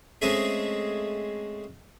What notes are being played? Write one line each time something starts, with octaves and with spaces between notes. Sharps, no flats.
G#3 A3 C4 C#4 G#4 E5